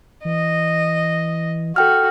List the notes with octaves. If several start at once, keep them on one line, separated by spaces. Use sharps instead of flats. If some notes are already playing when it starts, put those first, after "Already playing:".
E3 D#5
F#4 A4 G5 F6